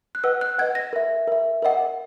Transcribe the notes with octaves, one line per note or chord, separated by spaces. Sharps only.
F#6
B4 D#5 F#5 E6
F#6
B4 D#5 F#5 G#6
A#6
A#4 E5
A#4 E5
A#4 D#5 F#5